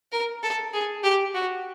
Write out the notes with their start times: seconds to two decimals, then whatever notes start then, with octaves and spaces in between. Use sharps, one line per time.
0.12 A#4
0.43 A4
0.73 G#4
1.04 G4
1.34 F#4